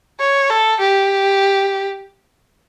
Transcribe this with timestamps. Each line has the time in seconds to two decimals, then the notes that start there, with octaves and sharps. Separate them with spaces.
0.20 C#5
0.50 A4
0.80 G4